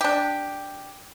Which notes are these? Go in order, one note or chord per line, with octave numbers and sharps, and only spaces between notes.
D4 G4